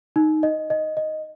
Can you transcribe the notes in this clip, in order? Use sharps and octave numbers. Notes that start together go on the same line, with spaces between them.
D#4
D#5
D#5
D#5